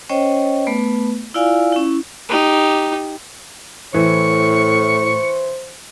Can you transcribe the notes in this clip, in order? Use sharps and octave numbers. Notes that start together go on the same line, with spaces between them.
C#4 C5 C#5 D#5 G5
A3 B3 B4
E4 F4 D5 F5 G#5
C#4 E4
D#4 G4
A2 E3 C5 C#6